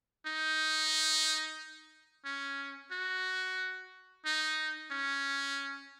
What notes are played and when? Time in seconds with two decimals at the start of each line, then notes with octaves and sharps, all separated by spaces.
0.26 D#4
2.25 C#4
2.92 F#4
4.25 D#4
4.91 C#4